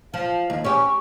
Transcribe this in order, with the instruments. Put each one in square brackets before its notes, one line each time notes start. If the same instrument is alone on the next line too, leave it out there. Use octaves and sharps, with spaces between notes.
[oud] F3 [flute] F5
[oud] D#2
[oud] C#4 G4 [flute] C#6